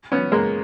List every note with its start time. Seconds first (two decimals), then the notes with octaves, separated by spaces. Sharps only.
0.12 B3 C#4
0.32 G#3 A#3